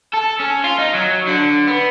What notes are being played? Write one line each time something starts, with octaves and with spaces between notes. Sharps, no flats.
A4
C#4
F4
D#4
F#3
D3
B3